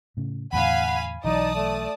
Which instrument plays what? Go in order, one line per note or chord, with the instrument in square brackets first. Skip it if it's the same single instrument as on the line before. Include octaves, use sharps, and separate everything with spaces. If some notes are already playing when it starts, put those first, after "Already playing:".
[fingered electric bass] A2 C#3
[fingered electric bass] E2 A2 D3 [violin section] F5 G#5 B5 [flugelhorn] F#5
[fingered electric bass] B1 E3 F#3 [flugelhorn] D#4 [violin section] D5 A5 D#6
[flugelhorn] A3